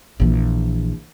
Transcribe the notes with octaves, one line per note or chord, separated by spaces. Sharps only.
A#1 E3